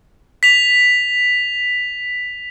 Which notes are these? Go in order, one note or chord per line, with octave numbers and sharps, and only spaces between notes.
B6 F7